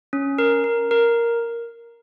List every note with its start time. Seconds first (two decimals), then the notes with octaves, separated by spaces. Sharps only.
0.13 C#4
0.38 A#4
0.64 A#4
0.91 A#4